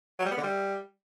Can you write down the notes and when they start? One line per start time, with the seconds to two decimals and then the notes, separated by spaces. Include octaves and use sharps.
0.19 F#3
0.25 G3
0.31 B3
0.37 D3
0.43 G3